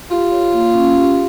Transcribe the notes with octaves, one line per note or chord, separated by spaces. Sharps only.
F4 G4
C#5
A#3
C#4
G4